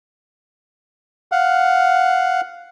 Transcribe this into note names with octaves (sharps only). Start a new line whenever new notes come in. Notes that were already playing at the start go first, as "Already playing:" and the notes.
F5 F#5